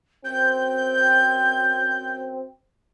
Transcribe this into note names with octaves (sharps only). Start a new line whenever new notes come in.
F#2 C4 G6